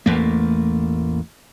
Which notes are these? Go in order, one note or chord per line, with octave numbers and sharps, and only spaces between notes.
A1 E2 A3 A#3